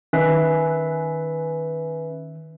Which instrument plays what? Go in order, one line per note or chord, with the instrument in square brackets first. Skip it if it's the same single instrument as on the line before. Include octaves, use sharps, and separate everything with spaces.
[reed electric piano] D#3 [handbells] C#4 B4 E5